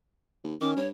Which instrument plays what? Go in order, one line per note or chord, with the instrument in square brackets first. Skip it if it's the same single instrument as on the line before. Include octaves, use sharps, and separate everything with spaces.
[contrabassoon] D#2
[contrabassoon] D#3 [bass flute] C#4 [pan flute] D6
[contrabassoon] G2 [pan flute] C#5